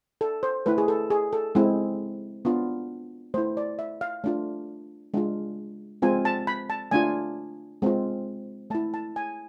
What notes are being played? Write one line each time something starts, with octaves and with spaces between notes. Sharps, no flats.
A4
C5
A3 E4 B4
G#4
A4
G#4
A4
G#3 C4 E4
B3 D4 F4
A3 E4 C5
D5
E5
F5
A3 D4 F4
G#3 D4 F4
G#3 C4 F4 G#5
A5
B5
A5
A3 D4 F4 G#5
G#3 C4 F4
A3 E4 A5
A5
G#5